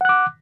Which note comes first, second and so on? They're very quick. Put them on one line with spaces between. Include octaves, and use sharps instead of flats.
F#5 F#6 D6